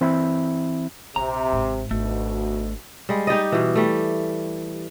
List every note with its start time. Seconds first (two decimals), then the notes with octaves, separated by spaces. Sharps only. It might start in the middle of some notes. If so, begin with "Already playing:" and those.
0.01 E3 C4 E4 E5 B5
1.16 A#1 C3 A#5
1.52 G#1 G#2
1.91 G#1 D2 B2 A3
3.09 G3 G#3
3.27 D#4 G4 D5 D#5
3.52 B2 E3
3.75 G3 A3